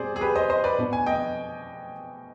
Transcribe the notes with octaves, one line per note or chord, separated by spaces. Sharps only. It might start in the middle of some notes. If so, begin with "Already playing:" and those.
Already playing: B2 G3 C4 G#4 C5 D5
G#4
G4 B4
C5 D#5
C5 D#5
B4 D5
B2 B3 D4
G#5
D#5 G5